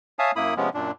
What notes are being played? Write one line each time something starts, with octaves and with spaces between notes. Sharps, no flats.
C#5 E5 F5 G#5 A5 D#6
F#2 A#3 E4 B5 D#6
C3 F3 G#3 B3 C#4
F#2 A#2 D4